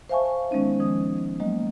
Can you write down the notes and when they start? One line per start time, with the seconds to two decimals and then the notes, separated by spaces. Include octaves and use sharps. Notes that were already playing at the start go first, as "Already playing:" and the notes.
0.09 C5 E5 F5 G#5 A5 C#6
0.51 D#3 G#3 B3 C#4 D#4
0.80 D#3 F3 D#6
1.40 D#3 F#3 G#3 A#3 D#5